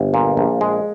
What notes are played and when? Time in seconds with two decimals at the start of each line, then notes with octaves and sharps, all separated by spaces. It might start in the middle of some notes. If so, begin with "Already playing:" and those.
Already playing: G1
0.14 A#2
0.37 A#1
0.61 G#3